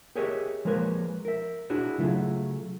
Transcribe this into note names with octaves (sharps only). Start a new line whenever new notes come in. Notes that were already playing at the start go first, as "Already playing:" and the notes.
G4 G#4 A#4 C#5 D#5 E5
F3 G#3 A#3 A#4 B4 C#5
A#4 E5
D4 E4 F#4 G#4
C#3 F#3 A3 F4 G#4